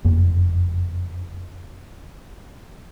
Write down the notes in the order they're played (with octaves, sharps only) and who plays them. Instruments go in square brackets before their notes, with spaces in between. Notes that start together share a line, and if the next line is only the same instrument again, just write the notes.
[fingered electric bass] F#1 F2 A#3